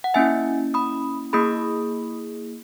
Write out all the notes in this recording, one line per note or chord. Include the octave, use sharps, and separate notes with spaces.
F#5
A#3 C#4 E4 E5 G#5
B5 D#6
A#3 E4 G#4 B5 D#6